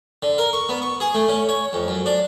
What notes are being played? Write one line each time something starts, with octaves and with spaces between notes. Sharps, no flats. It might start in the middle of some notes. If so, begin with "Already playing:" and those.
D3
A#4
C#6
B3
C#6
G#4
A3
C#4
C#5
F2
F#2
D4